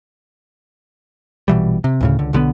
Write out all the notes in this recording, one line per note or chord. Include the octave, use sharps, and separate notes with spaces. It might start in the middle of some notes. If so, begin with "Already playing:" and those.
A#1 B2 E3 G3
C3
D2 A2 C#3
C#2 D3
B1 D3 F#3 B3